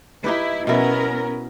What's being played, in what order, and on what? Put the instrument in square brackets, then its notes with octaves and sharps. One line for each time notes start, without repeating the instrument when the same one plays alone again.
[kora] D#4 G4 B4 [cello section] E4
[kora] B2 E4 [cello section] B3 C#4 A#4